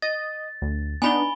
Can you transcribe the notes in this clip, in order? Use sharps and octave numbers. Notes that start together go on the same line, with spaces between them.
D#5 A6
D2
B3 D4 D#4 G#5 B5 G7